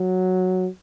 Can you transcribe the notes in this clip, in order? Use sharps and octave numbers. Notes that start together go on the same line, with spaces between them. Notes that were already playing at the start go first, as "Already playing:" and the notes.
Already playing: F#3